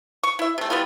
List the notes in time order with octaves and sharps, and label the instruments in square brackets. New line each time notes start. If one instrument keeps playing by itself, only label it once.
[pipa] C#6
E4 E5
C3 A3
G3 B3 E4 F4